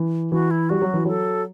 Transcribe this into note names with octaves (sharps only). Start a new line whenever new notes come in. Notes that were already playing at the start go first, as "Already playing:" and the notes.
Already playing: E3
E3 F#4
E4
G3 F#4
F#3
E3
F#3 A4